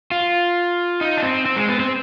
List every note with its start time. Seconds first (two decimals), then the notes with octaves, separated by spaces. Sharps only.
0.11 F4
1.01 D#4
1.17 D4
1.23 C4
1.46 C4
1.56 G#3
1.69 B3
1.80 C4